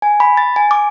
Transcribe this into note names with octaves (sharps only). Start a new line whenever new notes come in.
G#5
B5
A6
G#5
D6